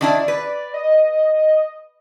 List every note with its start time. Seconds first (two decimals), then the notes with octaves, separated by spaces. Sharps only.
0.01 D#3 D4 E4 D5
0.28 B4
0.74 D#5